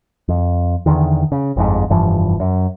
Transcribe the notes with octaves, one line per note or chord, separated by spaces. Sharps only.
F2
E2 D3 D#3
C#3
G1 F2 G#2
F1 G2 E3 F3
F#2